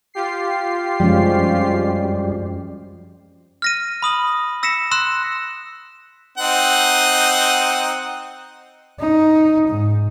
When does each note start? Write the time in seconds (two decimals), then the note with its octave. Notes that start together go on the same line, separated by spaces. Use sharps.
0.14 F4 G4 C7
1.00 F#2 F3 G3 G#3 C#4
3.62 F6 A#6 D#7
4.02 B5 D#6 F#7
4.63 E6 A#6 B6 C#7 E7
4.91 C6 E6 F#6 A#6 E7
6.38 C4 D#4 F#5
9.00 D#4
9.68 G#2